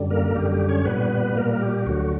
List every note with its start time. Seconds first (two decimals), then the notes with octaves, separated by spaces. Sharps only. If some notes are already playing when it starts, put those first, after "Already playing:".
Already playing: F#2 D3 G3
0.10 A#3 A#4
0.35 F#2 D3 G3 G4
0.52 G4
0.69 C#4 C#5
0.85 A#2 G3 B3 B4
1.36 A#2 G3 A#3 A#4
1.54 A#4
1.62 G4
1.86 D2 D3 F#3 F#4